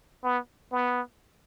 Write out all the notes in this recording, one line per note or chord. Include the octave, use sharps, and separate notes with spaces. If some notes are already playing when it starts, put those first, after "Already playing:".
B3
B3